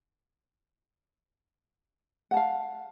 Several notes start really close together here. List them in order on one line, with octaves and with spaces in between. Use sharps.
F#5 A5 F5